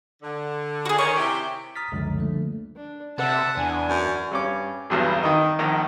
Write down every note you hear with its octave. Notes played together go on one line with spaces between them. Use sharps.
D3
F#4 G#4
D#3 C#4 C#6
C3 E4 G4
A#5 D#6 F6 A6 B6
C#2 F#2 D3 F3 G#3
D3 F3 G3 A3 A#3
D4
C3 E5 F#5 A5
E2 D4 G#5
F#2
G2 C#4 D6
B1 E2 G2 B2
D#3 D#5
A#1 D#3 A#5